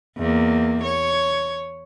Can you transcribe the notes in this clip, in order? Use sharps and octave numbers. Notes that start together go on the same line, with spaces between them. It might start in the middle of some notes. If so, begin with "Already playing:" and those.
E2 A#3
C#5